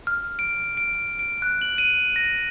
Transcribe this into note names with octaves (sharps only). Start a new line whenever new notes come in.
F6
D7
D7
D7
F#6
F#7
D#7
A#6